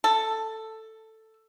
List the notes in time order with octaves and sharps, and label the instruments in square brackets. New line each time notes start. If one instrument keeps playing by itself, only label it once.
[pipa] A4